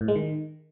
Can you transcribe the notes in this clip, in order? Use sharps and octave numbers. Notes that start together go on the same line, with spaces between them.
A2
G#3
D#3